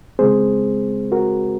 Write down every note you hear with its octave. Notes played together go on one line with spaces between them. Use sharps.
C#3 G#3 C4 G#4 C5
F#4 A#4